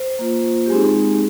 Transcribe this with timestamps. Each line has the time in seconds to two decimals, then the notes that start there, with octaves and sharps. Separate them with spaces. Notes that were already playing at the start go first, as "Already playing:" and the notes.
Already playing: C5
0.19 A#3 F4
0.66 G4
0.70 G#3 C4 D#4 G#4